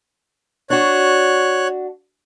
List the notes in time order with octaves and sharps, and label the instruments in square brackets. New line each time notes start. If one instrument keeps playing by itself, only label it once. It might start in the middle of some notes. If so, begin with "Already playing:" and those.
[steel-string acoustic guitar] D4 F#4 [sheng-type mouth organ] C#5 F#6